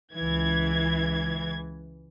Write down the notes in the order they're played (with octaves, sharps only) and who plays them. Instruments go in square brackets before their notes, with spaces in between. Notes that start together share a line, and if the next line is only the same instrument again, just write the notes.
[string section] C#2 E3 G#6